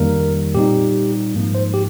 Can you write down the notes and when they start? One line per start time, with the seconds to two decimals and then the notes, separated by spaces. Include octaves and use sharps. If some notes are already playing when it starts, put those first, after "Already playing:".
Already playing: F2 D#3 G3 A#3 A#4
0.55 A#2 G3 C4 D#4 G4
1.35 G#2 F3 A#3
1.55 C5
1.74 G4